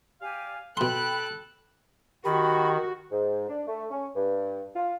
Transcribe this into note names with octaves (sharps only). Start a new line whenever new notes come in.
G4 D5 F5 G#5
B2 A4 G5 B5 C6 F#6
D#3 F#4 G4 B5
G#2
D4
A3
C#4
G2
F4